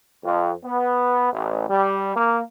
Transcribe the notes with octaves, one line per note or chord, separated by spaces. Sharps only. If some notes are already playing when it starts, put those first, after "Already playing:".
F2
B3
A1
G3
A#3